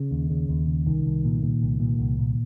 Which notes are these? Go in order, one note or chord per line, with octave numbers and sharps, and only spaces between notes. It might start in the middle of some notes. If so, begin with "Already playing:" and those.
Already playing: C#3
D#2
C#3
D#2
C#3
C2 D#3
C2
A#2
A#2
C2
A#2
C2
A#2